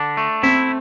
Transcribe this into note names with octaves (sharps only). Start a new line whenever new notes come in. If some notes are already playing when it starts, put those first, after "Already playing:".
Already playing: D3 D4
A3
C4 E4